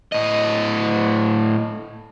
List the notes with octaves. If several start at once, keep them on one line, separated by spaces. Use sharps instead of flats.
A2 D#5